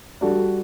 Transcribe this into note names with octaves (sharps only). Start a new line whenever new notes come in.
G3 D4 F#4 A4